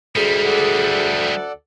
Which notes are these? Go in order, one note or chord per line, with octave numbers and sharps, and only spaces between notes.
D2 G3 G#3 G#4
A4 D5 F#5